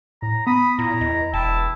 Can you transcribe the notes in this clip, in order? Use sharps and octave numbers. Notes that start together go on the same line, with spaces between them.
A2 A#5
B3 B5 D#6
A#2 E4 A#5
E2 D#5
E1 E4 G5 A5